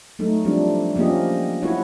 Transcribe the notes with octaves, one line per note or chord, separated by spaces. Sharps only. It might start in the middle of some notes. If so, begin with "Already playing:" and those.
F#3 A3 D#4
F3 G3 C4 D4
F3 A#3 C#4 G4 D#5
E4 F#4 C#5